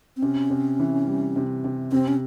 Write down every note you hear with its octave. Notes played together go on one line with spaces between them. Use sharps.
C4
C3 C#4
C3
E3
G3
C3
C3
C3 C4
C#4